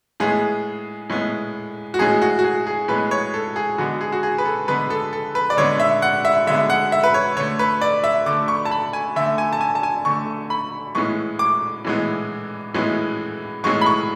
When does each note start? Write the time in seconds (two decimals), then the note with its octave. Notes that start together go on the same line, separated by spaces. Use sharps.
0.20 A2 G#3 B3 G#4
1.10 A2 G#3 B3
1.94 F#4
1.99 A2 G#3 B3 G#4
2.22 F#4
2.39 F#4
2.44 G#4
2.67 G#4
2.88 A2 G#3 B3 B4
3.11 C#5
3.34 A4
3.56 G#4
3.78 D3 G#3 B3 F#4
4.01 G#4
4.12 F#4
4.23 G#4
4.38 B4
4.45 A4
4.68 D3 G#3 B3 B4
4.90 A4
5.13 A4
5.35 B4
5.50 D5
5.57 D3 G#3 B3 C#5
5.80 E5
6.02 F#5
6.25 E5
6.47 D3 G#3 B3 E5
6.70 F#5
6.92 E5
7.04 B4
7.14 C#5
7.37 D3 A3 C#5
7.59 B4
7.81 D5
8.04 E5
8.26 D3 A3 D6
8.48 C#6
8.65 A5
8.71 B5
8.93 G#5
9.16 D3 A3 E5
9.38 G#5
9.53 A5
9.61 G#5
9.75 A5
9.83 G#5
10.05 D3 A3 C#6
10.50 B5
10.95 A2 E3 G#3 B3 C#6
11.39 D6
11.85 A2 E3 G#3 B3
12.74 A2 E3 G#3 B3
13.64 A2 E3 G#3 B3 C#6
13.81 B5
13.86 C#6